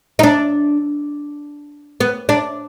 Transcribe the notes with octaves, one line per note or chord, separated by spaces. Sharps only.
D#4
D4
B3
D4